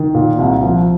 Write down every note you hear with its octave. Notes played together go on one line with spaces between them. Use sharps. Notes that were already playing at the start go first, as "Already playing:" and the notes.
Already playing: D#3
A#2
C2
F3